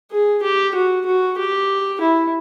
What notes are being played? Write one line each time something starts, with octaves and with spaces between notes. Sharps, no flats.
G#4
G4
F#4
F#4
G4
E4